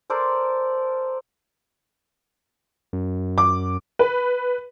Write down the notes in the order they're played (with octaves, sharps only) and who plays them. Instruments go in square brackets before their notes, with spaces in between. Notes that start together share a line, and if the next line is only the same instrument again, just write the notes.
[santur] A4 A#4 C5 D5
[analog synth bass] F#2
[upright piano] D6
[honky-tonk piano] B4